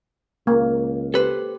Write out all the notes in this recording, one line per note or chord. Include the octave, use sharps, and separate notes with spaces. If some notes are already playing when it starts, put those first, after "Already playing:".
C#2 A#3
G4 A4 B4 C5